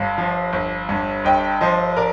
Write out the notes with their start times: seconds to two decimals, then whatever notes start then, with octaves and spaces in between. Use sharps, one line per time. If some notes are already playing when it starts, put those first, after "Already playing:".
Already playing: G1 G2 F5
0.18 F3
0.53 G1
0.89 G2
1.25 G1 D#5 G5
1.61 F3 C5 D#5
1.97 A#4 D5